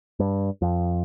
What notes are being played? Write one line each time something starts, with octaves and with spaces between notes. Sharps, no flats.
G2
F2